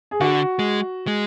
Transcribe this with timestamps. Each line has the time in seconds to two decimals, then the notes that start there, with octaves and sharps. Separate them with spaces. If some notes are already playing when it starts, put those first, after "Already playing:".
0.11 G#4
0.20 D3 F#4
0.59 G#3
1.07 G#3